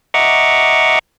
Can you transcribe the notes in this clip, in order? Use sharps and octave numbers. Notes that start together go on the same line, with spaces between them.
D#5 E5 F#5 A#5 C#6 D6